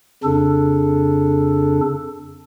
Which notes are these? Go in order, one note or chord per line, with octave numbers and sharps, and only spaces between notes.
F2 C#3 D4 A4